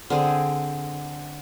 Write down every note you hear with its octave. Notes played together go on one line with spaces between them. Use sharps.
D3 C4 G#4